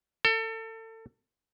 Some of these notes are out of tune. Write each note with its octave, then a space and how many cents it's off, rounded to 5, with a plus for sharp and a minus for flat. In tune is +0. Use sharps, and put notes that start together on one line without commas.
A4 +30